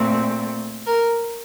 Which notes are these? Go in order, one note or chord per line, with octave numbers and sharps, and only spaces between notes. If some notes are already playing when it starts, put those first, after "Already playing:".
Already playing: A#2 A3 C4
A#4